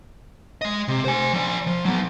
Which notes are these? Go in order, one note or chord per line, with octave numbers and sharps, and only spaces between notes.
G#3 D#5
C3
C5 G#5
F3 D5
F3
F#3 B3